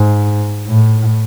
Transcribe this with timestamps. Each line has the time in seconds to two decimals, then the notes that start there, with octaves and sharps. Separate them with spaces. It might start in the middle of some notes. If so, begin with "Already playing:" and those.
Already playing: G#2
0.67 A2